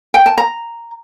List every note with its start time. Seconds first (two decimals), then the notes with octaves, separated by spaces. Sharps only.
0.14 G5
0.26 A5
0.38 A#5